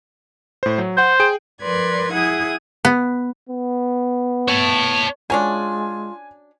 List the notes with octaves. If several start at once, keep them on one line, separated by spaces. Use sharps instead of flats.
A2 C5
F#3
C5 F#5 G6
G#4 G5 D7
F3 A#4 B4 D5 C6 G#6
E4 G#4 F#5 D#6
B3
B3
C#5 A5
F#3 G#3 C#4 D4 F4 G#5